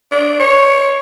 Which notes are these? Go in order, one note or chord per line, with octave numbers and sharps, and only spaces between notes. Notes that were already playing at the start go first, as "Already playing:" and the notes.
D4
C#5